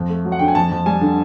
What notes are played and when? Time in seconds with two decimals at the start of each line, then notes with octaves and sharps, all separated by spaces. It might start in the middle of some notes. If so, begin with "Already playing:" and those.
Already playing: F2
0.09 A3
0.25 F#3
0.32 F#5
0.39 D3 G5
0.48 G#5
0.55 F2 A5
0.71 F2
0.86 G3 G#5
1.01 D3